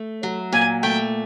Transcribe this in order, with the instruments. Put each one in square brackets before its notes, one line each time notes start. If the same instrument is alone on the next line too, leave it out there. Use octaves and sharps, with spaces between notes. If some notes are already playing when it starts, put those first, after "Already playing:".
Already playing: [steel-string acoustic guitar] A3
F#3
[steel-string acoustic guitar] A#2 [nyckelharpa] G#5
[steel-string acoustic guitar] A3 [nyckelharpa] G5